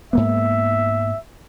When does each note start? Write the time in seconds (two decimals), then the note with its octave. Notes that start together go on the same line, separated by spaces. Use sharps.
0.13 G#2 A#3 B3 E5